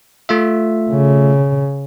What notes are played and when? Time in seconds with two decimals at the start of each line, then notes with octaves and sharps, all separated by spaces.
0.29 A3 F4 E5
0.91 C#3